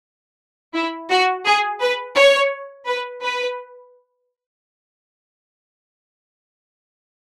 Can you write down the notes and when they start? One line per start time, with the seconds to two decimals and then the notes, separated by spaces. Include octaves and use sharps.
0.74 E4
1.10 F#4
1.45 G#4
1.80 B4
2.16 C#5
2.87 B4
3.22 B4